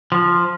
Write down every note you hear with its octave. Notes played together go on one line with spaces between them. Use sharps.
F3